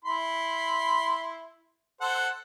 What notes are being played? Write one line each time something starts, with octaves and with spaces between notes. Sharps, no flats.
E4 B5 C6
A4 C5 F#5